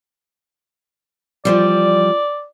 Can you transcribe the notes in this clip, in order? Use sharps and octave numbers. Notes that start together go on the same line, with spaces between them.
E2 F3 G3 D5